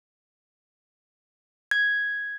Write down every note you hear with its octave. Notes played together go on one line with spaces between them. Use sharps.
G#6